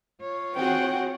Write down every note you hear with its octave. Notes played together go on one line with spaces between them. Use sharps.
F4 C#5
C4 F#4 G#4 F#5 G5